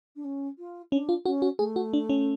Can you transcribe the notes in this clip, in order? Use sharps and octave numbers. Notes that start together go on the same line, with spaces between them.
D4
C#4
F4
C#4 D4
F4
C#4 F#4
F#4
A3 G#4
F#4
D4
C#4